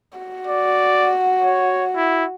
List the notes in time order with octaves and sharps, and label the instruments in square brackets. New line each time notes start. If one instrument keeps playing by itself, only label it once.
[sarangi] F#4
[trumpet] D5
C#5
E4